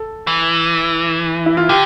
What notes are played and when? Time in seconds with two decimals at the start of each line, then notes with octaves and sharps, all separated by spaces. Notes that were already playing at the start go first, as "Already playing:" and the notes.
Already playing: A4
0.27 E3
1.46 E4
1.57 F4
1.69 D3 G4